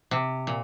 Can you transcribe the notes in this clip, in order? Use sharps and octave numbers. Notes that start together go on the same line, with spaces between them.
C3
A#2